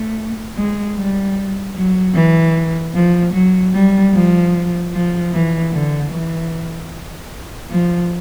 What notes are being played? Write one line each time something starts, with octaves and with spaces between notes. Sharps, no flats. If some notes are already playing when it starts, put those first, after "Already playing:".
Already playing: A3
G#3
G3
F#3
E3
F3
F#3
G3
F3
F3
E3
D3
E3
F3